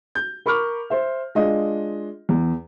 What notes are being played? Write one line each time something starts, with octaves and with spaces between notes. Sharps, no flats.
G6
A#4 B5 C#6 D6 F6
C5 E5
G#3 D4 F4 D#5
E2